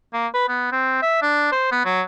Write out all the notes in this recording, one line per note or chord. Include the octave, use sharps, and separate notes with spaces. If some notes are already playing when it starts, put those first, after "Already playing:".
A#3
B4
B3
C4
E5
D4
C5
B3
F#3